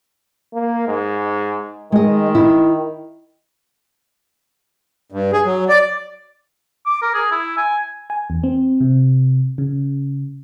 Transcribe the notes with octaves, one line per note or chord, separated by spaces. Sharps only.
A#3
G#2
D#3 G#3 D#5
E4
G2
G#4
F#3
D5
D6
A#4
G#4
E4
G#5
G#5
E2
C4
C3
C#3